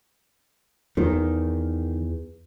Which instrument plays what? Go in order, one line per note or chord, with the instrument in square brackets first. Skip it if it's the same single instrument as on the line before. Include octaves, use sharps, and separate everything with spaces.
[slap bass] E2 [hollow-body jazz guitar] D#3